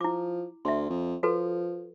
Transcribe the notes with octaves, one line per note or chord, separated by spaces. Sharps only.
F3 E4 D6
D2 E5 C6
F2
F3 F#4 A4 B4